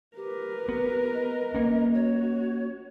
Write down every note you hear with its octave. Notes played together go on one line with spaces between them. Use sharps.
G4 A#4 B4
B3
D#5
A#3 C#4
F#4 C#5